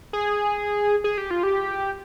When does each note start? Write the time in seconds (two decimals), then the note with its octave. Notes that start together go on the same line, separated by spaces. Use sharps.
0.13 G#4
1.04 G#4
1.18 G4
1.31 F4
1.43 G4